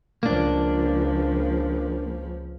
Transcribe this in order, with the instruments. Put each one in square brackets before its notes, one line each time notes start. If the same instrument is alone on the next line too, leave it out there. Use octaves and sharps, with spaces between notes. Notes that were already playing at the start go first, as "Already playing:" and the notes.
[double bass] C#2 F3 [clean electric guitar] A#3 D4